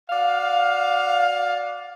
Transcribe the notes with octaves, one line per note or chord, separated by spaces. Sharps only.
F#4 D5 F5